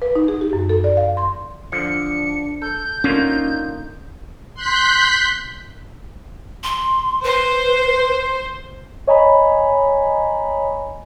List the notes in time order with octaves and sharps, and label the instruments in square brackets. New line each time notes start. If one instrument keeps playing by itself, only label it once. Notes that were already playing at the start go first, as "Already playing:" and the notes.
[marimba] B4
D#4
G#4
G4
F#2
A4
D5
F5
C6
[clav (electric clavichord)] D3 F3 [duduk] D4 [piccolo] C#7
[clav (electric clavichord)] A4 [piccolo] G6
[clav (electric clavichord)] D3 A#3 F4 [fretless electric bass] C#4 [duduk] D#4
[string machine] C6 F#6 G6 B6
[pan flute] C6
[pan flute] B4 [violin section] C5
[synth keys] C#5 D#5 G#5 A#5 B5